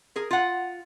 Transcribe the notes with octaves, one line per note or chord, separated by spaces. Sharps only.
G#4 A#4
F4 F#5